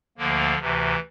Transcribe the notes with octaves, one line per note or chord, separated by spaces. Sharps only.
D2 D3 F3 A#3
D2 C3 E3